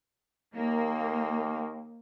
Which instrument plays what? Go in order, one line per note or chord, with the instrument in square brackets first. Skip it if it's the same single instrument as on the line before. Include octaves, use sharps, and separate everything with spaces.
[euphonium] D#2 [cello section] A#3